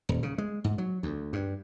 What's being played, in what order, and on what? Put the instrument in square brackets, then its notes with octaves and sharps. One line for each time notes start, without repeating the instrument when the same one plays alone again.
[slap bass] D#1
C#3
G#3
G#2
F#3
D2
G2